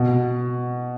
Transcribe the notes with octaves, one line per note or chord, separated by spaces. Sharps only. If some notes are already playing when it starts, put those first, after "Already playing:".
Already playing: B2